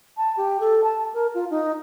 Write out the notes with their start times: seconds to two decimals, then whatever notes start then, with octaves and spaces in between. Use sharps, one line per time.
0.17 A5
0.37 G4
0.60 A4
0.84 A5
1.14 A#4
1.34 F4
1.51 D#4